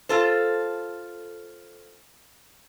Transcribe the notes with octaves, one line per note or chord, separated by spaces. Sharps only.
F4 A4 C5